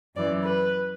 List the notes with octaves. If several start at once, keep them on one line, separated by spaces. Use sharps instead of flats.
F#2 E3 D5
B4